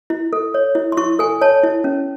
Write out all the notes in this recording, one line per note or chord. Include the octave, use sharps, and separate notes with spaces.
E4
A4
C#5
E4
C6
E4 C#6
A4 G#5
C#5 A5
E4
C#4